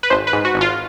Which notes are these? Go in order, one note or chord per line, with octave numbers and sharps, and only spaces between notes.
B4
G#1 C5
B4
G#2
F#4
G#1
F4